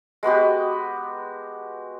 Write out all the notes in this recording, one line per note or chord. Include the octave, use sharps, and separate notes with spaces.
G#3 B3 F#4 G4